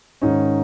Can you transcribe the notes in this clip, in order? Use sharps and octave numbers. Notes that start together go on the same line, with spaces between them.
G#2 D#3 C#4 D#4